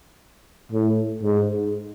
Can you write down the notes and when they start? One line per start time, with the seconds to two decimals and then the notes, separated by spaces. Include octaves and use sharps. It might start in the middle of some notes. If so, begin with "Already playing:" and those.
0.72 A2
1.23 G#2